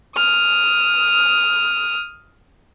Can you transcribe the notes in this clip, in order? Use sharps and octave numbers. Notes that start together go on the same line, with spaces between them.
D#6 F6